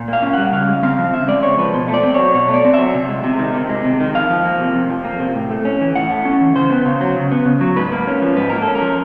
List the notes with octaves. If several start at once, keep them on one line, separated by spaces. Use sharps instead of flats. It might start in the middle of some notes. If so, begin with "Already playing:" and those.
Already playing: A#2
A#3 F5
C#4
G3 F#5
C#3 F5
G#3
C4 F5
F3
C#3 E5
G#3 D5
C4 C#5
F3 B4
B2 C5
A3
D5
C4
F#3 C#5
B2 C#5
A3
D5
C4
F#3 E5
C3
G#3
C3
D#3
C3
G#3
C3
D#3
F2 F5
F3
A#3
C3
F2
F3
A#3
C3
A2
A3
C#4
E3
A2 F#5
A3
C#4
E3
C#3 C5
B3
C#3
F#3
C#3
B3
C#3
F#3
G#2 B4
A#3
C#4
F3
G#2 B4
A#3 A#4
A4
C#4
A#4
F3